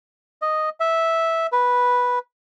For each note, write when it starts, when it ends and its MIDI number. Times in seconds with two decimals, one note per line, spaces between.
0.42 0.69 75
0.80 1.47 76
1.52 2.19 71